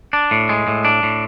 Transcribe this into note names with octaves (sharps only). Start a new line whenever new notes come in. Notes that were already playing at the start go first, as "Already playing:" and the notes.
D4
A2
G#3
A2
D4
A2